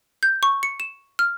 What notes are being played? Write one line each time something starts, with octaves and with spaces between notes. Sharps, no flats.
G6
C#6
C#7
E7
F6